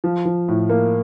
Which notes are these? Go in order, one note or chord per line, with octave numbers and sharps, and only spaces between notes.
F3
F3
A2
A#3